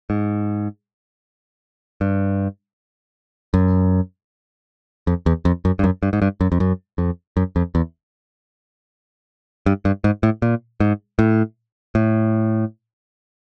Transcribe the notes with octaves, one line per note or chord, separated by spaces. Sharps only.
G#2
G2
F#2
F2
E2
F2
F#2
G2
F#2
G2
G#2
G2
F#2
F2
F#2
F2
F#2
F2
E2
G2
G2
G#2
A2
A#2
G#2
A2
A2